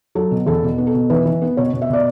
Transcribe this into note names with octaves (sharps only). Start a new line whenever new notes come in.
F#3 A4
B2
E2 A4
B2
B3
A4
B2
E3 B4
E3
B3
B2 C#5
B2
E5
B2 D5